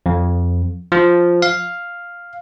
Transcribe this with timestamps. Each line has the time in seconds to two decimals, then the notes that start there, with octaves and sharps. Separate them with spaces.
0.06 F2
0.92 F3
1.42 F5